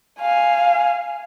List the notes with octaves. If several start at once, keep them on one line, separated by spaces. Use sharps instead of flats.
F5 G#5